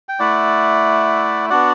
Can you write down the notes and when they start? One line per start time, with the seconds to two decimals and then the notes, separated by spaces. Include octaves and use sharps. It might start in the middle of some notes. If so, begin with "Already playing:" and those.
0.09 G5
0.19 A3 E4 D5 F#5
1.50 B3 D4 F#4 D5 F#5